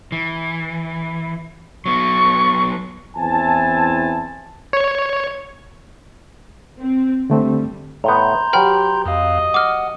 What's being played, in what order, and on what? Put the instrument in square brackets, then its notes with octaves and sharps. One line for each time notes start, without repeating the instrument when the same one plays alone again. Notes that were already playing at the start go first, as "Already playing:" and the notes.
[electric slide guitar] E3
[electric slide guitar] F#3 B3 [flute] C#6
[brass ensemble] E2 C4 E4 G#5 A5
[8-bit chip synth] C#5
[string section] C4
[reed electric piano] D3 A3 C4 [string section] G3
[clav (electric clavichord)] A2 B3 [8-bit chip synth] A#5 C6 G6
[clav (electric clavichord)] F#3 B4 [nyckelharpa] G4 [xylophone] G5 B5 F6
[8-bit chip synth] F2 F5 [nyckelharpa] D#5
[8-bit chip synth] F#5 [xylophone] D6 F6